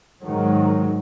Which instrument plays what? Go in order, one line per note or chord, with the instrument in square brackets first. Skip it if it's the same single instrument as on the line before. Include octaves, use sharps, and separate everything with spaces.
[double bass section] G#2 D#3 F#3